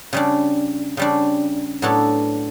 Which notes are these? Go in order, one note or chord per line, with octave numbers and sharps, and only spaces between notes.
C#3 G3 D4
C#3 G3 D4
A2 F#3 B3 D4 A4